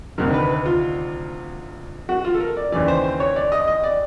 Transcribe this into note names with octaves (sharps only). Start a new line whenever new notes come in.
D2 C3 D#3 A#4
B4
B4
F4
F#4
F4
A4
A#4
D5
D#2 C#3 E3 D5
C5
C5
C#5
D5
D#5
D#5
D5